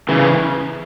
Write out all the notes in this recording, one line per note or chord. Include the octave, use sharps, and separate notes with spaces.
C#3 E3